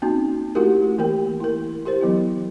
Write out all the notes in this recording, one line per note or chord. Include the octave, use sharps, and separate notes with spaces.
A#3 C4 C#4 D#4 F#4
A3 E4 F#4 G4 A#4
E3 A#3 G4 A#4 G5
E4 A#4
E4 G4 A#4 C5
E3 F#3 B3 E4